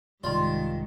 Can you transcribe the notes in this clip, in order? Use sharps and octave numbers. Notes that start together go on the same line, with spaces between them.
C2 G#2 D#3 F4 D5 C6